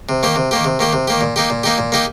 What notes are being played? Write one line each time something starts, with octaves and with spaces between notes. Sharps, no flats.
C3
D#3 A#3 G4
C3
D#3 A#3 G4
C3
D#3 A#3 G4
C3
D#3 A#3 G4
A#2
A#3 D#4 G4
A#2
A#3 D#4 G4
A#2
A#3 D#4 G4